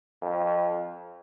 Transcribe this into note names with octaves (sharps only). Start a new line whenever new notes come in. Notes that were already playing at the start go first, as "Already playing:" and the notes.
F2